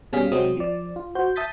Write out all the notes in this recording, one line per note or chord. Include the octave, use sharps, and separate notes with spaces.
B2 G3 C#4 G#4 F5 B6
C3 F#3 G#3 C4 D#6
F3 D5
F4
F#4 C5 G6
E5 A5 D#6 G6 A6 B6